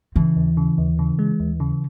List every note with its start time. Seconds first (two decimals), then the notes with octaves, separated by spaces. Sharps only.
0.16 C#3 E3
0.36 D#2
0.57 C#3
0.78 D#2
0.99 C#3
1.19 G#3
1.40 D#2
1.60 C#3